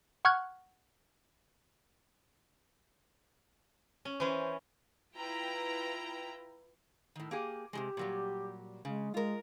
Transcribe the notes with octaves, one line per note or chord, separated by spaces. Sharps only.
F#5 C#6 F6 F#6 G#6
C#4
E3 C#4 C5
E4 F4 B4 G5 A#5
A2 D#3
A#3 G4 G#4
C3 D#3 G#3 G4
A#2 F#3 G3
C#3 G#3
G#3 F4 A#4